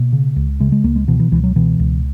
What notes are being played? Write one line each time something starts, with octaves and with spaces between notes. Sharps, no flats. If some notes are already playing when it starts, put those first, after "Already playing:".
Already playing: B2 A#3
C#3
C#2
C#3 G#3
G#3
C#2 A#3
G#3
B2 E3
E3
C#2 E3
F#3
B2 E3
C#2